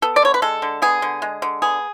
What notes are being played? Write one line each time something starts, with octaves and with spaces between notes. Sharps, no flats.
B3 A4
D5
D3 C#5
B4
G#3 A4
D3
B3 G#4
D3
G#3
D3
B3 G#4